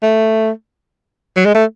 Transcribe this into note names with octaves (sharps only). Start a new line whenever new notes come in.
A3
F#3
G#3
A3